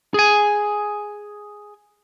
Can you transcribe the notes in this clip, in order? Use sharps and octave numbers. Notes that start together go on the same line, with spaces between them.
G#4 G#5